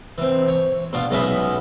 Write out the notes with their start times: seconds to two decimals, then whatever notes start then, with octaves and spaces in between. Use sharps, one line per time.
0.18 E3 C4
0.48 C#5
0.93 B2 D4 F4
1.11 B1 G#3 B3 C#4 E5 B5